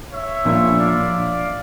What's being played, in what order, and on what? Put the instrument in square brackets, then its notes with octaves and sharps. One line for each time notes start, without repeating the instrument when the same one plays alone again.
[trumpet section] C#5 E5
[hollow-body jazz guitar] A#2 F3 A#3 D4
[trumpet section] D5 F5